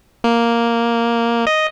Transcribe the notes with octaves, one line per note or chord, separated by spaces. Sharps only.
A#3
D#5